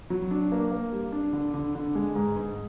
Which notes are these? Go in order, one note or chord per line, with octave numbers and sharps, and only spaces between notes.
F#3
D4
A#3
A#3
G3
D4
D3
D3
D3
G#3
G#2
G#2